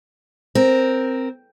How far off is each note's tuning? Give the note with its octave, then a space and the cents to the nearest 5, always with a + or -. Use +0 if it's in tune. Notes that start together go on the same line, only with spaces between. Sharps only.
C4 +0 A#4 +0